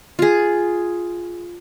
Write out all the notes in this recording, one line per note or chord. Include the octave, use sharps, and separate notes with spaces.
F4 G#4